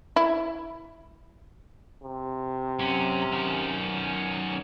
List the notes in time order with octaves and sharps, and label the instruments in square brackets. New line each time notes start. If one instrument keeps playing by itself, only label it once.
[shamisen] E4
[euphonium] C3
[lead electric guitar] F#2 [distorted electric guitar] C#4
[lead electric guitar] F#2 D#3